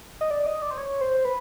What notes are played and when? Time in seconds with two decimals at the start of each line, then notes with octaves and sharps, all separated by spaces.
0.21 D#5
0.31 D5
0.46 D#5
0.62 D5
0.71 C5
0.78 C#5
1.01 C5
1.25 B4